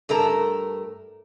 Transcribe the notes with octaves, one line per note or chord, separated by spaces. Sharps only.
G2 A3 A#4 A#5